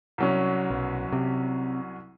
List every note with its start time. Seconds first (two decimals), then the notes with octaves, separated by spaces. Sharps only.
0.18 C2 F#3 C#4
0.71 B1
1.13 C3